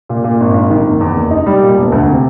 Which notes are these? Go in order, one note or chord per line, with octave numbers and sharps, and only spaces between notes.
A#2
A#2
G#1
G#1
D#3
F#1
E2
F#1
D#4
G3
A#2
E1
D2
C3